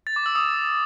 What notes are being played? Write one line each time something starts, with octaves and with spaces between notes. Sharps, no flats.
A6
D6
E6
D#6